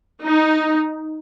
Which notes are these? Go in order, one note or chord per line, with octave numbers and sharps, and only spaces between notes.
D#4